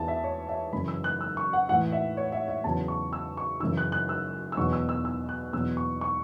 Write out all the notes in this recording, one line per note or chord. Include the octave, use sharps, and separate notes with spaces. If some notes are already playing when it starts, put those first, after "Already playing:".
Already playing: E2 E3 A5
E5
C#5
E5
F#2 C#3 E3 B5
E6
F#6
E6
C#6
F#5
A2 E3 F#5
E5
C#5
E5
E5
E2 C#3 F#3 A5
C#6
E6
C#6
F#2 C#3 E3 E6
F#6
F#6
E6
E6
E2 B2 F#3 C#6
E6
E6
E6
F#6
E2 B2 F#3 E6
C#6
C#6